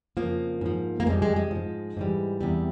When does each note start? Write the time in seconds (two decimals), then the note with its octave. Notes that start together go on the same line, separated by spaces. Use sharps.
0.17 F2 C#3 F3 A#3
0.61 G#2 F3
1.00 A#3
1.06 F2 C3 G3 G#3
1.22 G#3
1.36 G#3
1.51 G#2 F3
1.97 G#2 E3 G3
2.41 E2 C3 G3